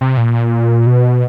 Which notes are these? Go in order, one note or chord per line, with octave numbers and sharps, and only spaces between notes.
C3
A#2
B2